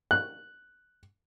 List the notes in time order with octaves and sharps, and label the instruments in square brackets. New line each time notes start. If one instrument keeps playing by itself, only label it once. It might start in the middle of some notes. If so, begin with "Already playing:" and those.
[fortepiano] F#6